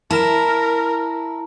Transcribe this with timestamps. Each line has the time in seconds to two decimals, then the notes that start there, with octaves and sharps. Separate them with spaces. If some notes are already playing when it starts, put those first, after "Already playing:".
0.11 E4 A#4 A5 A#5 E7